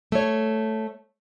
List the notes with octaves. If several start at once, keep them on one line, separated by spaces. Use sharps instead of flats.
A3 C#5